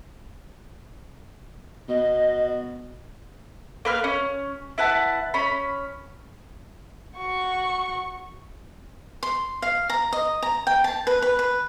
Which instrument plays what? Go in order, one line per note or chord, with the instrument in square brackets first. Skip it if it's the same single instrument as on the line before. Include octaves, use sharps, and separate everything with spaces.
[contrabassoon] B2 [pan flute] D#5
[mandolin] A#3 B4 F6
C#4
E4 B4 F#5 A5
C#4 B5
[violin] F#4 C#6
[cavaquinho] C6
F5
A#5
D#5
A#5
G5
A5
B4
B4
B4